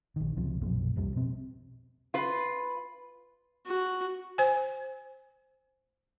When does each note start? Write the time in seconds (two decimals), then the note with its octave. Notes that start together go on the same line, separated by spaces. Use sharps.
0.16 A#1 D#3
0.37 C#2 C3 F3
0.61 B1 F#2 A#2 F3
0.96 C2 F2 G3
1.16 B2 C4
2.14 F4 B4
3.66 F#4
4.38 C5 G#5